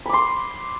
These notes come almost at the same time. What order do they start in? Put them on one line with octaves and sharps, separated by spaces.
B5 D6 C6